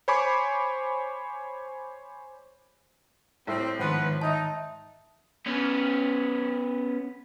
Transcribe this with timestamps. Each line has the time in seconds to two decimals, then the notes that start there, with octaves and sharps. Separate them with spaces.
0.08 C5 C#5 G#5 B5 C#6 D6
3.47 C2 A2 C4
3.80 G#2 D#3 F3 B3 B4 F#5 C6 F#6
4.21 D#4 E5 A5
5.46 B3 C#4